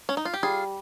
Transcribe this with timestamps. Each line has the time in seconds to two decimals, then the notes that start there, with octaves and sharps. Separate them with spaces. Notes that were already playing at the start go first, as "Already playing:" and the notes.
0.09 C#4
0.17 D#4
0.25 F4
0.34 G4
0.43 G3 F4 G#4